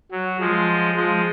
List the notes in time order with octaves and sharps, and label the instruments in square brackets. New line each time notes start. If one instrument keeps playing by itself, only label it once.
[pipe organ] F#3
F3 G#3
F3 G#3